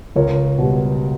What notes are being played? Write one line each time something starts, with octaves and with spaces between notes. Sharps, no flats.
C#2 A#4 C#5
B2 G3